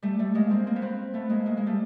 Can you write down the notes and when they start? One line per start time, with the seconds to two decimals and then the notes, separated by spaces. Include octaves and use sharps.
0.02 G3 A3
0.19 G3 A3
0.35 G#3 A#3
0.50 A#3 C4
0.67 A#3 C4
0.76 B3
0.82 A#3 C4
1.14 A3 B3
1.30 G#3 A#3
1.46 G#3 A#3
1.57 G#3 A#3
1.67 G3 A3